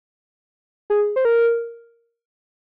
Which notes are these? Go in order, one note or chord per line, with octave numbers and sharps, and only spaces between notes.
G#4
C5
A#4